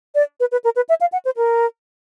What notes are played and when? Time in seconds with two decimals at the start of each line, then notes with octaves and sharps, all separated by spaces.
0.15 D5
0.40 B4
0.52 B4
0.64 A#4
0.76 B4
0.89 E5
1.01 F5
1.12 F#5
1.25 C5
1.37 A#4